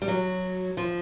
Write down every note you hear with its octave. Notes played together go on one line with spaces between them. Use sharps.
G3
F#3
F3